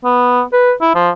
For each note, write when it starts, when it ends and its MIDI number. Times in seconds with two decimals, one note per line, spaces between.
0.05 0.42 59
0.53 0.72 71
0.82 0.94 64
0.95 1.10 53